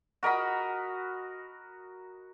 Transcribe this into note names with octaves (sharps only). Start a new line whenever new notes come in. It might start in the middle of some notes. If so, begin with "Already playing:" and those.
F#4 A#4 D#5 B5